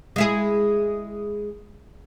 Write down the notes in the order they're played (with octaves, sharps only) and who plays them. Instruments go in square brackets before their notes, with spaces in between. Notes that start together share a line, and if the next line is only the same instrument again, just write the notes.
[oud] G#3 E4 G#4